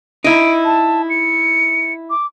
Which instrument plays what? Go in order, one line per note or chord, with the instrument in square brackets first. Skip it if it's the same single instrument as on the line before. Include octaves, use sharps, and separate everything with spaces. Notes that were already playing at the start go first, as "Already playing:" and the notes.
[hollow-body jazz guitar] D#4 E4 [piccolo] D7
[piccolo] A5
C#7
D6